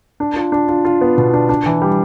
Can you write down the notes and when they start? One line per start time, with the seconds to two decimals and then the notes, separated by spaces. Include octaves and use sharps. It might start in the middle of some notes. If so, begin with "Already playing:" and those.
0.20 D4
0.36 F4
0.52 D4
0.68 F4
0.85 F4
1.01 B3
1.18 B2
1.33 D4
1.49 D4
1.66 E3
1.82 G3